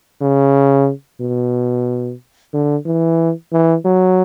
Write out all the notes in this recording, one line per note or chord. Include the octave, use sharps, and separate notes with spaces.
C#3
B2
D3
E3
E3
F#3